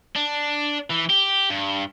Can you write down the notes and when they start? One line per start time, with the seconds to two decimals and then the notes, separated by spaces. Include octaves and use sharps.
0.16 D4
0.90 E3
1.10 G4
1.50 G2